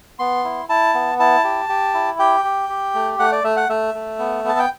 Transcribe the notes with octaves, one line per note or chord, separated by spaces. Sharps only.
B3 C6
E4
E4 A5
B3
E4 A5
G4
G4
E4
G4 G5
G4
G4
A3
A3 F#5
D5
A3 E5
F#5
A3 E5
A3
B3
B3 A5
G5